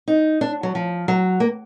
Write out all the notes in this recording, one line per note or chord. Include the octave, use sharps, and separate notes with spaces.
D#4
D4
F#3
F3
F#3
A#3